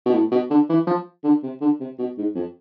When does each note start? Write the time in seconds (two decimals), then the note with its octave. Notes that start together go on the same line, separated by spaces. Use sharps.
0.06 B2
0.14 A2
0.31 B2
0.50 D3
0.69 E3
0.87 F3
1.24 D3
1.43 C3
1.61 D3
1.80 C3
1.98 B2
2.18 G#2
2.35 F2